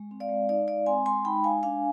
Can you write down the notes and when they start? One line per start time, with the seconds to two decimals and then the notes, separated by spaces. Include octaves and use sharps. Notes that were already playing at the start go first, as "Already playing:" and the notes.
Already playing: G#3
0.11 C4
0.20 D5 F5
0.29 G#3
0.49 D#4 D5 F5
0.68 G#3 D5 F5
0.86 C4 G#5 C6
1.06 G#3 G#5 C6
1.25 D#4 G5 B5
1.44 G#3 F5 G#5
1.63 D4 F5 G#5